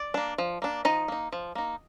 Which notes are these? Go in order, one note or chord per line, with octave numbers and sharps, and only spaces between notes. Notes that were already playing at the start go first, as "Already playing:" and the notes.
Already playing: D5
A#3 D4
F3
A#3 D4
F3 D#4 D#5
A#3 D#4
F3
A#3 D#4